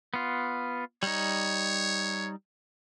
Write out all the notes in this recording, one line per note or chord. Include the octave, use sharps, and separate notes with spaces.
B3 F4
G3 D#4 C#5